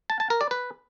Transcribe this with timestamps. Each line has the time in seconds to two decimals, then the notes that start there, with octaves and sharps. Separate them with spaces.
0.10 A5
0.20 A5
0.30 A#4
0.41 D5
0.51 B4